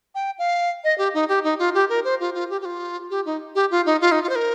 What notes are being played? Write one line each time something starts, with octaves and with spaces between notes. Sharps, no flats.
G5
F5
D#5
G4
D#4
G4
D#4
F4
G4
A#4
C5
F4
F4
G4
G4
F4
G4
D#4
G4
F4
D#4
F4
D#4
F4
C5
A#4